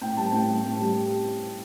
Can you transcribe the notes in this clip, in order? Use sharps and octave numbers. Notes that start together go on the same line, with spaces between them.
A2 G5
G3 A5
A2 G5
G3
A2
G3